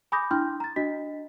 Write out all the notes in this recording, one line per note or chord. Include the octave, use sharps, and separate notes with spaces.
G#5 B5 D6 D#6 G6 A#6
D4 E4 G5 C6 F6 G6
A#5 A6
D4 F#4 D#5 B6